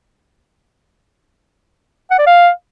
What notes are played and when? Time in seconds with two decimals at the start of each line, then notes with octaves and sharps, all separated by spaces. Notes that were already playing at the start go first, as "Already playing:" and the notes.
2.11 F#5
2.19 D5
2.27 F5